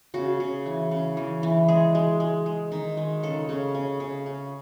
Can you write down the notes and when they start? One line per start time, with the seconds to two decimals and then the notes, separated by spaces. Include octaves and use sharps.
0.14 C#3 F#4
0.40 C#3
0.66 E3
0.91 C#3
1.17 E3
1.43 E3
1.68 G#3 G#4
1.95 G#3
2.20 G#3
2.46 G#3
2.72 D#3
2.97 G#3
3.23 C#3 A4
3.49 C#3
3.75 C#3
4.00 C#3
4.26 C#3